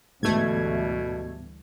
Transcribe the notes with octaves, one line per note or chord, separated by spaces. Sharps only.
D2 G#2 B2 E3 G3 A3 B3 G#6